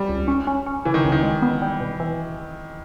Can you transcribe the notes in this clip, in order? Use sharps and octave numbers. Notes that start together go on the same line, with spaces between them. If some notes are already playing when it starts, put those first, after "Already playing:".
Already playing: G3
C#2
C#4
C#4
C#4
C#3 E3
D#3
C#2
D#3
G#3
B3
G3
B2
E3